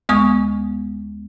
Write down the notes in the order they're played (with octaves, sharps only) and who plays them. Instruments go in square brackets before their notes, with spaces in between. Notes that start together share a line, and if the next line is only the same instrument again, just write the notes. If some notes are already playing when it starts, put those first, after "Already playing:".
[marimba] D2 G#3 B3 G#5 C#6 D#6